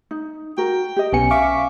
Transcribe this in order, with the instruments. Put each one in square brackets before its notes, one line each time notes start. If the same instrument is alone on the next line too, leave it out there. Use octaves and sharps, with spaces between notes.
[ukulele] D#4
[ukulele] F#4 A#4 [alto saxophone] G5
[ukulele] G4 D#5
[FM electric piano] B1 B3 C#7 [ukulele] C#4 G#5
[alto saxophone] E5 [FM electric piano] F5 C#6 D6